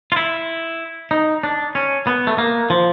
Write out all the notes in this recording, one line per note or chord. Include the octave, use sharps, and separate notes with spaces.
F4
E4
D#4
D4
C#4
B3
A3
A#3
F3